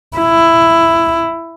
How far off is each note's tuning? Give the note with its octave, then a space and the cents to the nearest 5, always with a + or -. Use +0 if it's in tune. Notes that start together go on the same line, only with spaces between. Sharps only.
E4 +10